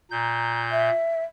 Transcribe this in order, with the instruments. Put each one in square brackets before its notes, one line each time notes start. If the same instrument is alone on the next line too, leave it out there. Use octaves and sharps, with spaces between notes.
[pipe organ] A#2 G6 [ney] A#5
[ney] E5